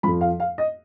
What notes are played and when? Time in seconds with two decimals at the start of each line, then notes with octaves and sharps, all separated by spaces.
0.03 F2 F3 B5
0.21 F5
0.40 F5
0.58 D#5